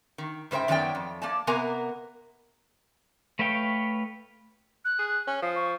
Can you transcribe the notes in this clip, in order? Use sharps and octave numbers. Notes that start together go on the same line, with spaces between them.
D#3
G#2 C#3 C5 E5 G5
F#2 D#3 F#3 B3 D5 G5
F2
A#3 D5 A5
C3 A#3 B3 A#4 G#5
A3 B4 C#5 F5 G5
F#6
G#4
C#4
F3 D#6
C#6